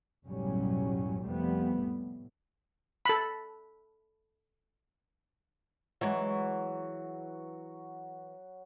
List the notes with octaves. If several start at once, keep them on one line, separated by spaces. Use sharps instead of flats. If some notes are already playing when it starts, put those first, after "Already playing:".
F#1 B1 A2 F#3 G3 C#4
F1 F3 G3 A3 B3
A2
A4 B5
E3 F#3 G#3 F#4